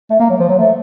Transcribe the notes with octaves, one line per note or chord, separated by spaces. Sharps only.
A3
A#3
F#3
F3
F#3
A3